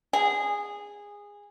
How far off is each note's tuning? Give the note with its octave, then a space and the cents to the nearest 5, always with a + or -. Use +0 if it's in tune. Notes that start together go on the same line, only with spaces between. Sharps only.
G#4 -15